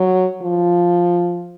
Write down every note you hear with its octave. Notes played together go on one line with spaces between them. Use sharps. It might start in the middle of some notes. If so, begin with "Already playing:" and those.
Already playing: F#3
F3